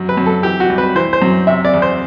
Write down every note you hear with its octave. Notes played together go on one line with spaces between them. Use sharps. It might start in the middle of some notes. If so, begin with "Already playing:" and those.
Already playing: F#2
B4
F#2
A4
E3 G4
F#4
C2
B4
E3 C5
C5
F#2
C3 E5
D5
E2
C5